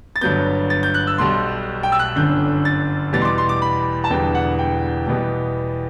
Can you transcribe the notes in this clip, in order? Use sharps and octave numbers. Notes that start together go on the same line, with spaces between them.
A6
G1 G2 F#3 B3 G6
A6
G6
F#6
E6
B1 B2 G3 C6
G5
E6
F#6
G1 F#2 D3 G6
A6
E2 B2 G3 B3 A6
C6
D6
C6
D6
B5
A5
E1 E2 D3 G3 B3 G5
F#5
G5
E2 B2 G3 B3